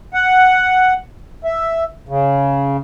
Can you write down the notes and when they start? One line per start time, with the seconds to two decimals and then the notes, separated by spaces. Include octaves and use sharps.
0.14 F#5
1.44 E5
2.09 C#3